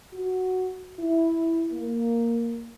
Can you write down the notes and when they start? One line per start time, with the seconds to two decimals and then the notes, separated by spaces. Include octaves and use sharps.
0.14 F#4
0.99 E4
1.72 A#3